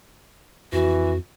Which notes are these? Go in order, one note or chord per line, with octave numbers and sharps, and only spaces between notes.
F2 E3 F#4